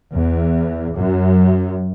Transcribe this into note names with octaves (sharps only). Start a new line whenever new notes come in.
E2
F#2